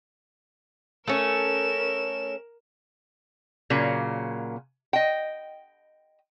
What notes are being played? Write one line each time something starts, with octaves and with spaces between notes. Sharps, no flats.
A3 C#4 A#4 E7
A#2 C#3 F#3 A#3
D#5 G5